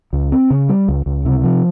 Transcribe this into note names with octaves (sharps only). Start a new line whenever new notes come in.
C#2
C4
C#3
G3
C#2
C#2
C3
F3